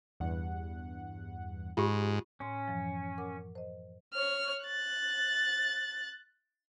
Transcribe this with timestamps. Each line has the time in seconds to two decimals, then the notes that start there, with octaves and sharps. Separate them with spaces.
0.20 E2 G2 F#5
1.77 G#2 F4 G4
2.40 A2 C#4 C6
2.68 F#2 E3 F3
3.18 A#4 F#5 D6
3.55 C5 D#5
4.14 C#5 F6
4.65 F#6 A6